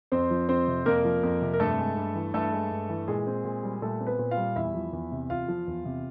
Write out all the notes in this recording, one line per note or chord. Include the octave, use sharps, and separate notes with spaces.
F2 C4 C5
F3
F2 C4 C5
C3
F2 A#3 A#4
F3
F2
C3
A#4
G2 A3 A4
G#3
G2
E3
G2 A3 A4
G#3
G2
E3
A#2 G#3 G#4
C4
A#2
G3
A#2 A3 A4
C4
B3 B4
A#2
F4 F5
G3
E2 E4 E5
F3
E2
C3
E2 F4 F5
F3
E2
C3